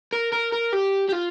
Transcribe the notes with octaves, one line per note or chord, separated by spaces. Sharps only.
A#4
A#4
A#4
G4
G4
F4